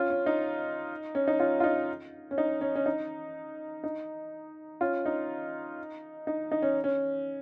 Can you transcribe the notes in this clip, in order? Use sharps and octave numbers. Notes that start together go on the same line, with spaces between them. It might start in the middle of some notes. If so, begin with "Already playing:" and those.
Already playing: C#4 F4
C#4
D#4
C#4
D#4
C#4 F4
F4
D#4
C#4
D#4
C#4
C#4
D#4
D#4
C#4 F4
D#4
D#4
D#4
C#4
C#4